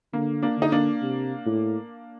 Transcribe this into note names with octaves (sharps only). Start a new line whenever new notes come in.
D3 A#3
A#3 D4
D3 D#4
A#3 D4
C3
A2